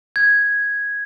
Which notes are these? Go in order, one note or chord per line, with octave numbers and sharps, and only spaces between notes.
G#6